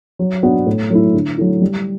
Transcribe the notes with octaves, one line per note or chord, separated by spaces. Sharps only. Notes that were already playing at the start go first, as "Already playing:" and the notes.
F#3
B3 D4 F#4
A2
F#3 A3 E4
D3
F#3 A3 E4
G3